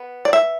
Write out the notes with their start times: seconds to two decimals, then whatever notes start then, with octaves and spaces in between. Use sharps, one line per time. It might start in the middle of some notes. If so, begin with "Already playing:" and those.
Already playing: B3
0.25 D5
0.33 E5